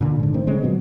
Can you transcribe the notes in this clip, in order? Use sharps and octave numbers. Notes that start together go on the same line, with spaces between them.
A#2 D3
G#2 D3
D#3 A3 C4
C#3 G#3 C4
A#2 D3 F#3 B3